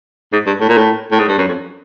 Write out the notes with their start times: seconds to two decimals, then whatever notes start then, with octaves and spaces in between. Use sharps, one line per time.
0.32 G#2
0.47 G2
0.60 A2
0.69 A#2
0.77 A2
1.12 A2
1.19 G#2
1.28 G2
1.38 F#2
1.48 F2